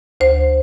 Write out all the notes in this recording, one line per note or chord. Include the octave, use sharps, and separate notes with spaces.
D2 C5